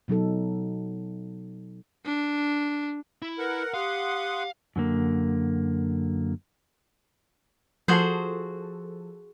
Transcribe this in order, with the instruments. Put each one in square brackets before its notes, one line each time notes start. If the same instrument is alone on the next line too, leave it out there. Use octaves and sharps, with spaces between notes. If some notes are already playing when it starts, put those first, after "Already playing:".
[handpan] B2 F#3 D#4 A4
[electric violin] D4
[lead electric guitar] E4
[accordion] A#4 F#5 [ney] B4
[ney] G4 [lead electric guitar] F5 [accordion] F#5 C6 D#6
[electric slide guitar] F#2 D3 A#3
[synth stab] F3 A4 [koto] F#4 G#4 C5